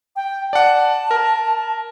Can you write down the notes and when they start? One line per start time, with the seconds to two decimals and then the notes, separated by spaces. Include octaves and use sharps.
0.16 G5
0.53 D5 F#5 A5
1.11 A#4